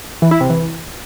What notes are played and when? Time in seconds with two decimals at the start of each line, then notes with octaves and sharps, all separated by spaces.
0.22 E3
0.31 E4
0.41 C3
0.50 E3